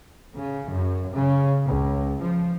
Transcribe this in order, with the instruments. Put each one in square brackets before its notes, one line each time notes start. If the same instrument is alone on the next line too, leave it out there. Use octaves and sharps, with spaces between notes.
[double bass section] C#3
F#2
C#3
C#2
F3